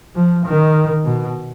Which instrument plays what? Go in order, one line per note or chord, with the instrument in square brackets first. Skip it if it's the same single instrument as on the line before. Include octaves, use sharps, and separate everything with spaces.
[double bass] F3
D#3
B2